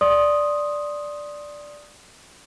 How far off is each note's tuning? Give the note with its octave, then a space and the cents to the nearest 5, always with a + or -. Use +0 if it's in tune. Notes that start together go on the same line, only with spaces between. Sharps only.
D5 +0 C6 +20 D#6 +0